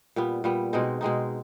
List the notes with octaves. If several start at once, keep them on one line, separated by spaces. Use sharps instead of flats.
A#2 G3 B3
A#2 G3 B3
B2 G#3 C4 D#4
B2 G#3 C4 D#4